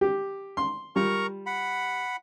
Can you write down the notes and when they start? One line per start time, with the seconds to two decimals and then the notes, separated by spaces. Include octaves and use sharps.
0.01 G4
0.57 C6
0.96 G3 F4 A#4 A#5 C#6
1.46 F#5 B5